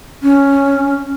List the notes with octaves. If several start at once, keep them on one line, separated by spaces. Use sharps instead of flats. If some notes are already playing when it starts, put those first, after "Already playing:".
C#4